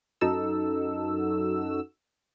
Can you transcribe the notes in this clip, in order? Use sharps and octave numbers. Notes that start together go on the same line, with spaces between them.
F#2 D#4 F#4 A4 E6